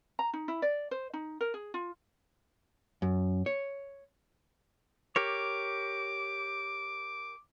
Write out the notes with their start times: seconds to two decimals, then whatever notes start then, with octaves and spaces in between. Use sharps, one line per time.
0.19 A#5
0.33 D#4
0.48 E4
0.62 D5
0.91 C5
1.13 D#4
1.41 A#4
1.54 G#4
1.74 F4
3.02 F#2
3.46 C#5
5.16 G4 A#4 C#5 D6